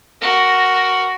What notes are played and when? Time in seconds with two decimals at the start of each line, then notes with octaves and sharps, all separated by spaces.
0.21 F#4 A#4